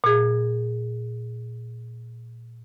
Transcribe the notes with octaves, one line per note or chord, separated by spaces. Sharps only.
A#2 G#4